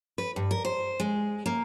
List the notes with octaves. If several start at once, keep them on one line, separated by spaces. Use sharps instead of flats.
B4
G2
A#4
C5
G#3
A#3